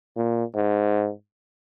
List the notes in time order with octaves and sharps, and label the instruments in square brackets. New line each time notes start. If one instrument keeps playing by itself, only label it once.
[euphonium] A#2
G#2